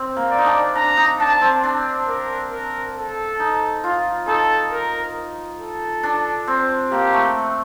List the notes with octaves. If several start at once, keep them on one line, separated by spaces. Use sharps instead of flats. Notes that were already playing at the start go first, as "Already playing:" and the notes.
Already playing: C4
A#3
D5
D#4
D4
D4 A#5
D#4
D4 A5
C4
D4
A#4
A#4
A4
D#4
F4
D#4 A4
A#4
A4
D4
C4
A#3 G4
A3